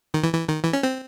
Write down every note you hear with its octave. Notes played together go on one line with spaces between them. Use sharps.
D#3
E3
E3
D#3
E3
C#4
C4